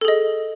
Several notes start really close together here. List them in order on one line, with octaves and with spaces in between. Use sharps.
A4 G#4 D#5